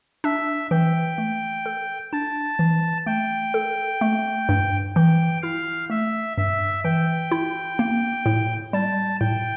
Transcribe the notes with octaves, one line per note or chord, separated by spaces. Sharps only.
D4 E5
E3 G5
A3
A4
D4 A5
E3
A3 G5
A4
A3
G2
E3 G5
E4 F5
A3 E5
G2 E5
E3 G5
E4
A#3
A2
G3 A5
A2 G5